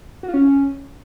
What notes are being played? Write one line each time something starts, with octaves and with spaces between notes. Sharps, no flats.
F#4
F4
C#4